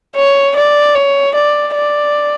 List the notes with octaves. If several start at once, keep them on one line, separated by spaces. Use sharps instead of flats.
C#5
D5
C#5
D5
D5